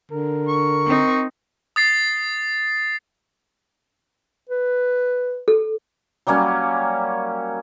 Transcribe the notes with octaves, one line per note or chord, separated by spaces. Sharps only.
D3 A#4
C#6
C4 D#4
D#6 A6 C7
B4
A4
F#3 G3 A#3 C#4